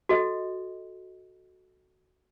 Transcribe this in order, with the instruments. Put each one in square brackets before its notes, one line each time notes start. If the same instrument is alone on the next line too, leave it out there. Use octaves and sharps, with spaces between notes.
[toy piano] F#4 A4 D#5